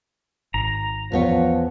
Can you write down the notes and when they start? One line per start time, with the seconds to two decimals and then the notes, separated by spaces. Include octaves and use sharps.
0.54 G#1 A#5
1.12 E2 F3 B3 C#5